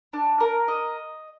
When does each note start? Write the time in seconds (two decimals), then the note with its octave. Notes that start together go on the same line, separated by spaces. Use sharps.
0.13 D4
0.40 A#4
0.68 D#5